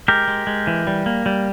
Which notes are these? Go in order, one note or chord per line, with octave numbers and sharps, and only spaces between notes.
G#3 G4 A#4
G#3
G#3
E3
G3
A#3
G3